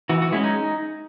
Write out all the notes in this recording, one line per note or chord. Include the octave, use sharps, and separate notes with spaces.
E3 F#4
F#4
G#3 C#4 E4
D#4